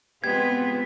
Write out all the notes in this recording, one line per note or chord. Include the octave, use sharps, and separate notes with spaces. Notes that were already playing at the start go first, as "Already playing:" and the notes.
G#3 B3 C4 F4 G4 G#6